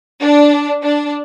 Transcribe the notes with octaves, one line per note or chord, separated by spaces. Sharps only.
D4
D4